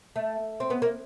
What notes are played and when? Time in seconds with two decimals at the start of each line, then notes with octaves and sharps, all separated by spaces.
0.16 A3
0.60 C4
0.70 B3
0.82 A#3